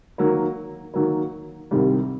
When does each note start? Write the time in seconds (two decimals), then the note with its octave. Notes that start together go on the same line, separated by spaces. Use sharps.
0.18 D#3 F#3 A#3
0.94 D#3 F#3 A#3
1.71 C2 C3 D#3 G3